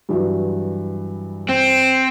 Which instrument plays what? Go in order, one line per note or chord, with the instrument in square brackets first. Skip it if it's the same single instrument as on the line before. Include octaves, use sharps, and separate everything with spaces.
[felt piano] G2 E3 F#3
[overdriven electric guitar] C4